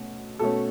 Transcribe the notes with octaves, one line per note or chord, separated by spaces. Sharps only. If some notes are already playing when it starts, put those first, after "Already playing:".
Already playing: B2 A3 C#4
B2 A3 C#4 A4